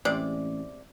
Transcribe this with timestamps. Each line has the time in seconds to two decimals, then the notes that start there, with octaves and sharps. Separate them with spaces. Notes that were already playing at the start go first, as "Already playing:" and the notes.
0.05 A1 C3 G#3 D5